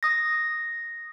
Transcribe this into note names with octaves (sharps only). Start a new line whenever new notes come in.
D#6 A#6